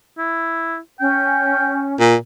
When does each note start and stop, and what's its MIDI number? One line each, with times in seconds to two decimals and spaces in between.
0.18 0.78 64
1.00 1.96 61
1.00 1.85 79
2.00 2.16 46